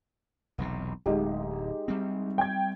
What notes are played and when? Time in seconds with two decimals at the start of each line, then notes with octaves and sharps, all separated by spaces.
0.58 E1 B1 C3
1.06 D1 G#3 D#4 G4
1.88 G3 C4
2.38 G5 G#6